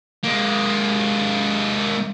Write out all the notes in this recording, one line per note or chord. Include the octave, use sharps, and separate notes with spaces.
G#3 A#3